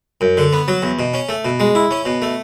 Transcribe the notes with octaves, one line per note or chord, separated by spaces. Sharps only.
F#2
D3
B3
F#3
E2
B2
C#4
A3
B2
G#3
E4
C#4
B2
A3